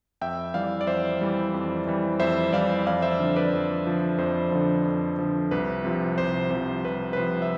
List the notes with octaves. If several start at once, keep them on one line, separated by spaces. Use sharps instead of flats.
F2 E5 G5
E3 G3 D5 F5
D5
F2 C5 E5
E3 G3
F2
E3 G3
F2 C5 E5
E3 G3 D5 F5
F2 D5 F5
C5 E5
D3 F3
B4 D5
F2
D3 F3
F2 C5
D3 F3
F2
D3 F3
C2 B4
C3 F3
C2 C5
C3 F3 C5
C2 B4
B4
C3 F3 C5
E5